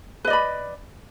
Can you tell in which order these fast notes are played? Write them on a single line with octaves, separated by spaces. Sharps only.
B4 D#5 D5 B5